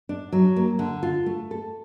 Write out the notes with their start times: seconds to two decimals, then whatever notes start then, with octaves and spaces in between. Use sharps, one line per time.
0.09 D4
0.32 F#3
0.56 A#3
0.79 D3
1.03 F4
1.26 A3
1.51 A4